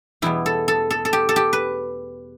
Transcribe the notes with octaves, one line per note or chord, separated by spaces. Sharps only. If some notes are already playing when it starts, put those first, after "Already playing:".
E2 B2 G3 B3 E4
A4
A4
A4
A4
G4
A4
G4
B4